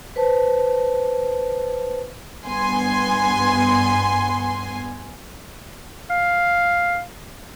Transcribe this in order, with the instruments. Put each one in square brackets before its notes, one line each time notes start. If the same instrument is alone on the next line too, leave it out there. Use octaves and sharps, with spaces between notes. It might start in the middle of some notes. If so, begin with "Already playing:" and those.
[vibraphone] B4 C5 A5
[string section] G2 B3 G#5 C6
[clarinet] F5